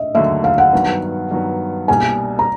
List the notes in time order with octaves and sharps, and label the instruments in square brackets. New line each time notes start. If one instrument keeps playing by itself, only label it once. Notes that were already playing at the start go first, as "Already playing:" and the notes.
Already playing: [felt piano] D#5 E5
[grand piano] D#2 D3 F#3 A3 [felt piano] E5
[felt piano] F5
F#5
[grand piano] G2 D#3 F#3 B3
G2 D#3 F#3 B3
[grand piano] C2 B2 G3 A#3 D4 [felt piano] G#5
[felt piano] A#5